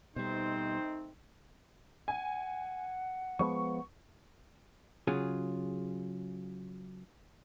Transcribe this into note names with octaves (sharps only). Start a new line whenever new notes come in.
B2 D#3 G3 A3 C4 D#4 C5
F#5 G#5
F3 G#3 B3 C#6
C#3 F#3 F4 G#4